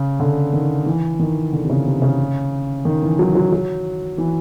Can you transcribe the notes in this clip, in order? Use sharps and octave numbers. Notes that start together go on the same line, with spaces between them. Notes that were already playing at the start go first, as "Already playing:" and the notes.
Already playing: C#3
D3
D#3
E3
D#3
D3
C3
C#3
C3
C#3
D#3
E3
F#3
F#3
F#3
E3